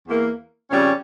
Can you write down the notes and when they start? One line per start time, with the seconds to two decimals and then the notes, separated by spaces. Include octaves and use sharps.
0.08 E2 E3 A#3
0.71 F2 C#3 G3 C#4